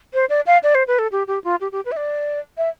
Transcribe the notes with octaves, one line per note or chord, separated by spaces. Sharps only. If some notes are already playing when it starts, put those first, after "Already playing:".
C5
D5
F5
D5
C5
B4
A4
G4
G4
F4
G4
G4
B4
E5
D5
E5